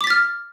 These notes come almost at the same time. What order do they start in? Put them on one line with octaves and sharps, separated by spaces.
D6 B6 A6 F6